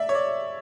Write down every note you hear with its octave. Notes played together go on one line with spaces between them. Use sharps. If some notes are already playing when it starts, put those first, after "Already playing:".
Already playing: D5 E5
C#5
D5